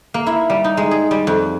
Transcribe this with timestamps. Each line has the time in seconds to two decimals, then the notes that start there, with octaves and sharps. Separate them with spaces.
0.14 A#3
0.26 E4
0.50 G3
0.64 D#4
0.77 G#3
0.91 G#4
1.11 G3
1.27 F2